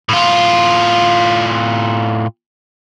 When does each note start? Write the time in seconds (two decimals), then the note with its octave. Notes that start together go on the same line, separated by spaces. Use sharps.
0.09 A2 F4